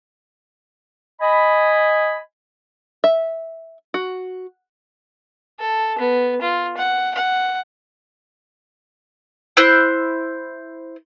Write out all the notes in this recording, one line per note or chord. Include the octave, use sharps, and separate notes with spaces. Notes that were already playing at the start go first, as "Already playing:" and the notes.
D#5 G#5 B5
E5
F#4
A4
B3
F4
F#5
F#5
E4 C5 F#6